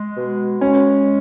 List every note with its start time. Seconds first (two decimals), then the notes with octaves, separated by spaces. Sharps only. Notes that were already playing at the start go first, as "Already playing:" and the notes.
Already playing: G#3
0.16 B2
0.61 G#3 C#4